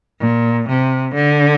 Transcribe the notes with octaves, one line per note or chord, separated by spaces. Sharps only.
A#2
C3
D3